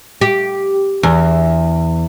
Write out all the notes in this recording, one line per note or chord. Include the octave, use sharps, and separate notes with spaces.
G4
E2